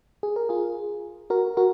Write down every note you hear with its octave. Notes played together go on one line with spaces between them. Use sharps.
G#4
A#4
F4 G#4
F#4 A#4
F#4 A#4